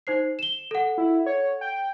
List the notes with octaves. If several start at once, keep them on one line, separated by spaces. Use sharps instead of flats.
D#4 C5 C7
E7 G7
A4 F#5
E4
C#5
G5